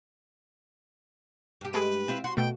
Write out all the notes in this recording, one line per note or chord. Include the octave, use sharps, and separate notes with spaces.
G2 G4
G#3 A3 B4 D7
C4 E4 F4
F#4 C6
B2 A3 G5